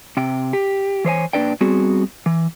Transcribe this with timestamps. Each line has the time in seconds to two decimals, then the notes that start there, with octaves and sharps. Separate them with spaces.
0.17 C3 G5
0.53 G4
1.05 E3 C5 C#5 G#5
1.33 A#2 A#3 D4 B4 D5 G5
1.61 G3 B3 C4 F#4 G#4
2.26 E3